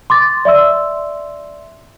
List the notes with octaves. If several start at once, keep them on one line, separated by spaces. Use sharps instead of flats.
C6 D6 A6
D5 E5 C6 E6